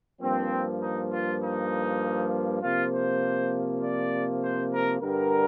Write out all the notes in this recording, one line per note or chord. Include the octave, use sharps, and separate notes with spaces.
G2 F3 A#3 C4
D#4
F4
D#4
C3 F3 A#3 F4
C5
D5
C5
A#4
G2 D3 G3 A#4